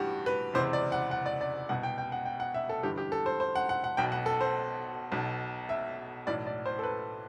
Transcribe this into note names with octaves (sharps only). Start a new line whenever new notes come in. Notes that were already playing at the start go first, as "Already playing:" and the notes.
Already playing: A1 G2 E3 F#4 G4
B4
F#1 E2 C3 E3 C5
D5
F#5
F#5
D5
D5
C2 B2 F#5
G5
G5
F#5
G5
F#5
E5
A4
G1 G2 E3 G4
G4
A4
C5
C5
F#5
F#5
F#5
B1 B2 G5
F#5
A4
C5
B1 B2
E5
B1 A2 E3 D5
D5
C5
A4
B4